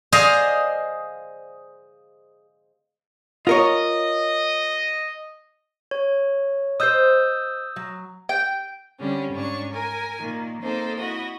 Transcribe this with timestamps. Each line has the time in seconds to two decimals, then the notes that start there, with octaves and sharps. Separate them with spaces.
0.12 G#4 C5 D5 D#5 F5
3.47 F4 A#4 C#5 D#5
5.91 C#5
6.80 C5 D#5 D#6 E6 G6
7.76 F#3
8.29 G5
9.00 D3 G3 C4 C#4
9.33 G#2 C#4 D4 C#6
9.71 A#4 G#5
10.21 A#2 D#3 A#3
10.61 A#3 C4 D#4 A4 C5
10.99 E4 F#4 D#5